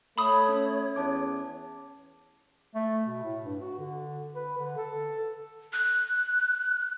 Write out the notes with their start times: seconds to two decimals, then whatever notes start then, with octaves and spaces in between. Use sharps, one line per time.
0.18 A3 C#5 B5 D#6
0.49 C#4
0.96 E2 C#4 A5 D6
2.75 A3
3.04 B2
3.23 A2
3.44 G2
3.61 F#4
3.79 D3
4.35 B4
4.58 D3
4.77 A4
5.73 F#6